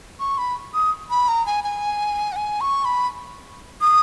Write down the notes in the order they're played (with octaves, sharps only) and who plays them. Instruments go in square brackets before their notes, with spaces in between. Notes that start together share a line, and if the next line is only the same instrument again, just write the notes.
[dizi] C#6
B5
D#6
B5
A#5
G#5
G#5
F#5
G#5
C#6
B5
D#6